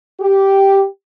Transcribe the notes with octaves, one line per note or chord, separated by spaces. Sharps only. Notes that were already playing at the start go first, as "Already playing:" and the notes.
G4